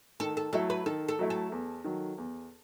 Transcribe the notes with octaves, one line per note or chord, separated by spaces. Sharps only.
D#3 A4
A4
F#3 A3 E4 A4
B4
D#3 A4
A4
F#3 A3 E4
A4
E2
D#3 F#3
E2